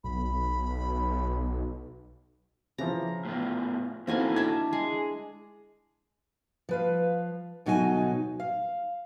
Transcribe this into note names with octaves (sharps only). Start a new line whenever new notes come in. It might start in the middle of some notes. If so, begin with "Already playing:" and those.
B1 B5
C#3 E3 F3 A#5
A2 B3 F4
E3 A#3 C4 D#4 E4 F#4 A4 G#5
D4 E5 G#6
G#3 G#4
F3 B4 F5
D2 B2 F#3 D#4 F#4 G#5
F5